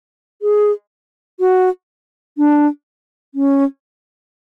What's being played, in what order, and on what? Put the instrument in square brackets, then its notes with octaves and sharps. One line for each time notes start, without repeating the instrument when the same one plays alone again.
[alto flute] G#4
F#4
D4
C#4